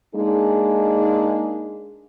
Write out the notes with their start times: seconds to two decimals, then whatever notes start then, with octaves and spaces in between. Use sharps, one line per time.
0.15 G#3 A#3 D4 D#4 G#4